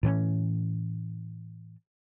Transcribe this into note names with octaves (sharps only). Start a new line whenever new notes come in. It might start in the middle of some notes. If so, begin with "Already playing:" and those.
A2 E3 C4 C#4